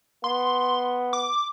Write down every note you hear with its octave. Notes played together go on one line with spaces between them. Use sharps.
B3 C6
D6